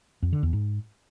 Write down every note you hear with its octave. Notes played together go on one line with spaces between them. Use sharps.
F2
D3
E2
G#2